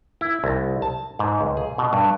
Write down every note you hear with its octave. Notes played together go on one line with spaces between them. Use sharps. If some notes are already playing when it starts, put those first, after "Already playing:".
E4
C2
A5
G#2
C#2
G#4
B2
G2